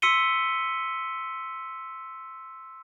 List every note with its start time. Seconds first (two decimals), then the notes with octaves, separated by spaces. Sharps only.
0.02 C6 E6 B6 C#7 D#7 G7